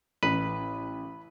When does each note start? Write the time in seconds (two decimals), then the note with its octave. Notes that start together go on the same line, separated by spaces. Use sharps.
0.23 A1 B4 B5